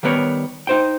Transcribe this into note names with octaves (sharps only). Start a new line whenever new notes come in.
D#3 G3 B3 A#4 C#5
D#4 C5 G5